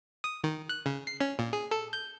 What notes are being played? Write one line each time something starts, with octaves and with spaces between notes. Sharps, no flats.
D#6
D#3
F#6
C#3
C7
C#4
A#2
G#4
A4
G6